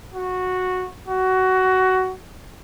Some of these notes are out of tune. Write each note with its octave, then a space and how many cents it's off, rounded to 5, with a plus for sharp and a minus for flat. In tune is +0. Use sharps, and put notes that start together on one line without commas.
F#4 -10
F#4 +15